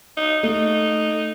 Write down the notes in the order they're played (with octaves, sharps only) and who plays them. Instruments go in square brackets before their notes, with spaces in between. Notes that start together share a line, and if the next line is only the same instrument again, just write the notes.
[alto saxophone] D#4
[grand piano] A3 [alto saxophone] D#4